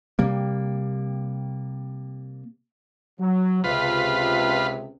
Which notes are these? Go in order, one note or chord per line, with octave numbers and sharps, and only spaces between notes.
C3 G3 A#3
F#3
C#2 C3 F4 B4